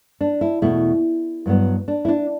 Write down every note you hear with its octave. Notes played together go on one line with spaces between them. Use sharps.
D4
E4
E2 B2 A3 E4
G2 F#3 B3
D4
E4
D4